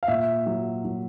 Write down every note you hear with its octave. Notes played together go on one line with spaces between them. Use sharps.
F5
A#2 E5
F#3
F#3